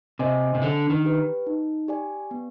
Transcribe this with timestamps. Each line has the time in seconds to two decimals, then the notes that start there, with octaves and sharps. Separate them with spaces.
0.19 C3 C5 D#5 G#5
0.55 C3
0.62 D3 D4
0.90 D#3
1.05 G4 B4
1.47 D#4
1.88 G4 D5 G#5
2.31 B3